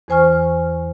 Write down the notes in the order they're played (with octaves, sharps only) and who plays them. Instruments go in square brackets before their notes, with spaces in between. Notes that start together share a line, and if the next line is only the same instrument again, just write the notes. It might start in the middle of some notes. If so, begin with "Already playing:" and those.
[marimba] E2 E3 C5 G#5 C#6 F6